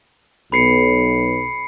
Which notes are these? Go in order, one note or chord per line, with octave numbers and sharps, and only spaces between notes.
B1 B5 C7 C#7